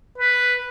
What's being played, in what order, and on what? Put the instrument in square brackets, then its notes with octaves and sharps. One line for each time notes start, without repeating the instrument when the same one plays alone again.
[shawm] B4